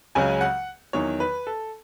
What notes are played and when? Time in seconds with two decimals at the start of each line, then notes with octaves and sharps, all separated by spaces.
0.15 C#2 C#3 F#3 G#5
0.41 F#5
0.93 E2 D#3 F#3 C#5
1.20 B4
1.47 A4